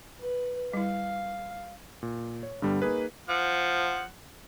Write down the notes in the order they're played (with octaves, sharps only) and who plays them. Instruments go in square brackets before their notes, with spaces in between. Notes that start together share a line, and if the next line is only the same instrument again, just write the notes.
[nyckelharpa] B4
[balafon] G3 E4 [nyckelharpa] F5
[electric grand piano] A#2
C#5
G2 D3 G3 B3
A#3 D#4 G#4 B4
[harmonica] F3 F#5